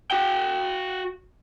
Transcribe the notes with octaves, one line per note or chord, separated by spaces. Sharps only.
F#4 G5